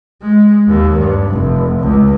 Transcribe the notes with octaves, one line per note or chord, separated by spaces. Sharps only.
G#3
D#2
G2
F1
C#2